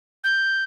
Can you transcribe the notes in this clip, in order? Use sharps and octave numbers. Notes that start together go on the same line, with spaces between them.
G6